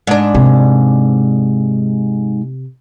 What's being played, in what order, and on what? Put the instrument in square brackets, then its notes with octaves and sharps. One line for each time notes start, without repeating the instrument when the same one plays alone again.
[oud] G#2 D4
[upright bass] C3